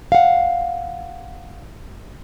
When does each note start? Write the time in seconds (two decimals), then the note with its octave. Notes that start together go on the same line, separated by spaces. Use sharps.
0.12 F5 F#5